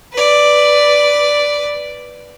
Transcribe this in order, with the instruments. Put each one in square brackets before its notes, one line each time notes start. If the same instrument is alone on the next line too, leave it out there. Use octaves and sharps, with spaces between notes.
[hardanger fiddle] B4 D5